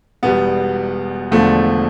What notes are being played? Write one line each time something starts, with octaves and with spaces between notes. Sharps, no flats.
E1 E2 B2 G3 B3
E1 E2 D3 F3 A3